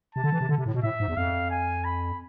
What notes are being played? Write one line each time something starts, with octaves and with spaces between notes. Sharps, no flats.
C3 A5
D3
E3
C3
D3
C3
A2
B2
A2 E5
G#2
E2
F2 F5
G#5
B5